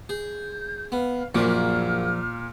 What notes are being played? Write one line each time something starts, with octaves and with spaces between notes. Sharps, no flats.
G#4 G6
B3 F5
A#1 F#2 A#2 F3 A#3 D5 F6